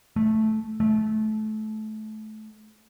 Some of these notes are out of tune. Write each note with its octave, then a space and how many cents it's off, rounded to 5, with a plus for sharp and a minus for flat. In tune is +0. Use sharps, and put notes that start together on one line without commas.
A3 -10
A3 -25